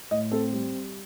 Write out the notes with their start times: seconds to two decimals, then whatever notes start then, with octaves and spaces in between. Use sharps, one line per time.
0.11 A2 D#5
0.32 C4 A4
0.53 G3